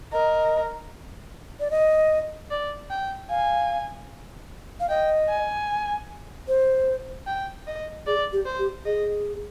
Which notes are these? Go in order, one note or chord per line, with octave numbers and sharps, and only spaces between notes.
A#4 D#5
D5
D#5
D5
G5
F5 G#5
F5
D#5 G5
G#5
C5
G5
D#5
G#4 D5
G4
C5
G4
G#4 D#5